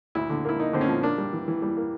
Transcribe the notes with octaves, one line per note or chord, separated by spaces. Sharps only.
D2 E4
D3
A#3 E4
A#3 D#4
D3 C4
C#4
F3
A#3 D4
G3
E3
E3
G3
A#3